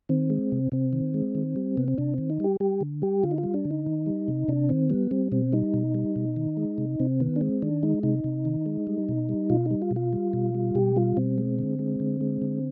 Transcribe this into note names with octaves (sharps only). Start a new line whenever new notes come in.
D#3 C4
G#3
C3
C3 C4
D#3
G#3
D#3
G3
C3 B3
C4
C3 D4
D#3 C4
D#4
G3 G4
G3 G4
D3
G3 G4
D3 F4
D#4
F4
G3
D4
D3
D#4
D#3
G3
C3
C3 D4
D#3 C4
G3 B3
G3 C4
B2 C4
G3 D#4
B2
G3
B2
D#3
G#3
C3
C3 C4
D#3 B3
D4
G#3 C4
D#3 D4
G#3 D#4
C3 D#4
C3
D#3
G#3
G3
B2
G3
B2 F4
D#4
G3
F4
B2
F4
G3
B2
G3
B2 G4
G3 F4
B2 C4
G#3
D3
G#3
D3
G#3
D3